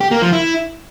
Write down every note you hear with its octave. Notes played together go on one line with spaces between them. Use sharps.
G4
A#3
F3
E4